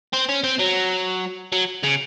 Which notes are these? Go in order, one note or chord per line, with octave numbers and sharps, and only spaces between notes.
C4
C#4
C4
F#3
F#3
C#3